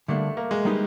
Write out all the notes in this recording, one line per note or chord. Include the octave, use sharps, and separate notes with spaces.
D3 G3 A3 A#3 D4
A#3
G#3
G3 A#3 D#4 G4 B4